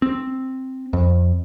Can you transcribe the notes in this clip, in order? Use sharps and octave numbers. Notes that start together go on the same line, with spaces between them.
C4
F2